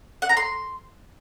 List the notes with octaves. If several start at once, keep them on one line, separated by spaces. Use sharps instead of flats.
F#5
A#5
C6